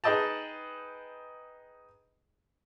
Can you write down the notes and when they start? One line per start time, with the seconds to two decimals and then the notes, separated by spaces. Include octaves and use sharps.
0.04 D#4 G#4 B4 D#5 G5 A5